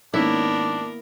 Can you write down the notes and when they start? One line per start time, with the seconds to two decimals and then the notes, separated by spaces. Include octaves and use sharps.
0.14 G#2 D#3 A#3 B3 C#4 D4 E4 A#4